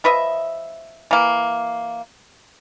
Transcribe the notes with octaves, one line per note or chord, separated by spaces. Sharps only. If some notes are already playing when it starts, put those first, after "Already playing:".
F3 B4 D#5 E5
E3 A#3